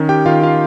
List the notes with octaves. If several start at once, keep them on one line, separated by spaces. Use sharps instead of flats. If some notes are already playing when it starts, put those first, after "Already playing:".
Already playing: D#3 C#4
G4 G5
D#3 F4 F5
F4 F5